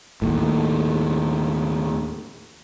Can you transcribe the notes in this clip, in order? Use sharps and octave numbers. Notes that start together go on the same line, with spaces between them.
D#2 A2